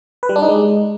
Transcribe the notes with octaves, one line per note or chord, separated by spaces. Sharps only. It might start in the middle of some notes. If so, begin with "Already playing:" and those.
B4
G3
D4
D#4
G#3